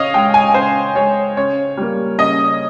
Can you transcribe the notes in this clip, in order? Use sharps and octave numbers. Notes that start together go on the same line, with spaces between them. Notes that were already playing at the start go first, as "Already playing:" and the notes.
Already playing: C#3 C#5 D#5 F5
G#3 G5
G#5
C#3 C5
G#3 C#5
C#3 C#5
G3 A#3
C#3 D#5